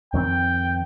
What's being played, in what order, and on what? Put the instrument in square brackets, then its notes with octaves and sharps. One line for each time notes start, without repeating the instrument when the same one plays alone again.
[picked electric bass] F2 D#3 C4 [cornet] G5